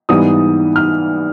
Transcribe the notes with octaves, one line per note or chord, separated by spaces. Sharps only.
G#2 E3 G3 B3 D#6
F6